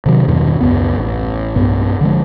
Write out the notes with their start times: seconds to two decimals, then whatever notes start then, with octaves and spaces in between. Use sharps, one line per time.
0.06 C3 D#3 F#3
0.28 E2 G2 B2 D#3
0.61 C#2 F#2 B3
0.98 A1
1.56 B1 G2 B3
2.01 D3 F3 G#3